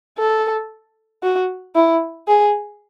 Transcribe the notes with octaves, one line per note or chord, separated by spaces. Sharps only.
A4
F#4
E4
G#4